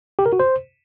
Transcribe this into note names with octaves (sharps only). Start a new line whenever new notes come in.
G4
A#4
F#4
C5